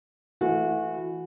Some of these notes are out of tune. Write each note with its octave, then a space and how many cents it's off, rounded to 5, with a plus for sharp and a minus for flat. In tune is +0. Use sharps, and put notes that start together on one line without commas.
E3 +0 A3 +5 F#4 -25